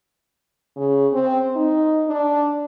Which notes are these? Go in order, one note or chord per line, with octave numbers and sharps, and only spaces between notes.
C#3
C4
D#4
D4